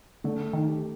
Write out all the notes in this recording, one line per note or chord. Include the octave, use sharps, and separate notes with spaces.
D3 A3
D#3
G4